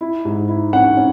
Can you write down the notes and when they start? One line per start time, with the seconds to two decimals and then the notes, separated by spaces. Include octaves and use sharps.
0.01 E4
0.25 G#2
0.49 E4
0.73 C#4 F#5
0.97 C#4